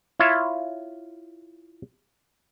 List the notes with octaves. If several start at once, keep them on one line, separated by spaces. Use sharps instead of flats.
E4 F4 C#5 E5